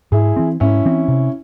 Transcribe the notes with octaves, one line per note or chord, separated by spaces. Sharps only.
G#2 E4 G#4
E3 C4
G#2 C#4 E4
E3 C4
C3